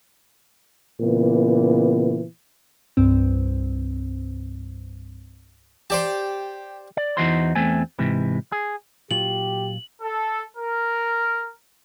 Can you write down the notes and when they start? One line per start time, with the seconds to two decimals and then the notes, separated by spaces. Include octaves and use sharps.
1.01 A#2 C#3 E3 B3
2.97 C2 G2 C4
5.90 G4 C5 D5 A5
6.97 D5
7.17 E2 E3 D#4 F#4 C5 C6
7.56 E2 A3 C4 G#5
7.99 G#2 C3 E3
8.52 G#4
9.11 A#2 F#3 F4 G4 F#7
10.01 A4
10.57 A#4